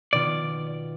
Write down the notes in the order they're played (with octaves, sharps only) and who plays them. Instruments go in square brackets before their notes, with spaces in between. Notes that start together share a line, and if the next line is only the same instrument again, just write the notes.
[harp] B2 D#3 F4 [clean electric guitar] D5